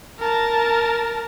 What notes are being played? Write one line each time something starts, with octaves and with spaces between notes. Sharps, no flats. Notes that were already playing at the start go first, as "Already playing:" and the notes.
A#4 A5